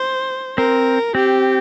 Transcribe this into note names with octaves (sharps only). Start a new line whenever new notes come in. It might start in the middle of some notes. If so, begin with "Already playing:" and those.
Already playing: C5
C4 A#4
C4 G4